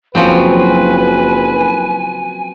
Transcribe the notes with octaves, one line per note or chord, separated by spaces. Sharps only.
F#1 F3 F#3 C4 B4 G#5